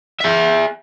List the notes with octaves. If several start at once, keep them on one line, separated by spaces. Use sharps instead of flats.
G#4 E5